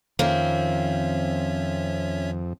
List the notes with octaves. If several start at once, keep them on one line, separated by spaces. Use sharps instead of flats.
F2 D#3 F3 A#3 C4 C#4 C#5 E5